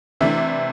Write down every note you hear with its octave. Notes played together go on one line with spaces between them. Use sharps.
C3 E3 A3 D4 E5